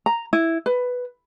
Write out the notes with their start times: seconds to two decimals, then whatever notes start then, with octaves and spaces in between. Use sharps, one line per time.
0.06 A#5
0.33 E4
0.66 B4